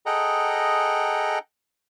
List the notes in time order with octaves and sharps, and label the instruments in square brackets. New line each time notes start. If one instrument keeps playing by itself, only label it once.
[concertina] G#4 A4 D#5 F#5 G5 A#5